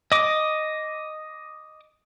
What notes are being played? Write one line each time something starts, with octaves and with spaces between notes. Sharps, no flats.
D#5 D6